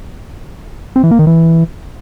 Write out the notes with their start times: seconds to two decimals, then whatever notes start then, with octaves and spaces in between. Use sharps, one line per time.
0.96 C4
1.04 E3
1.11 A#3
1.19 D#3
1.27 E3